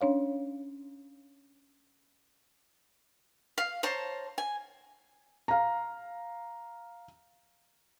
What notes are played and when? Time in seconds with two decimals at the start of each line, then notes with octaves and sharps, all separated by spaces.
0.01 C#4 D4 C#5 F5
3.58 F5
3.83 C5 C#5 A5 A#5
4.38 G#5
5.48 F5 A#5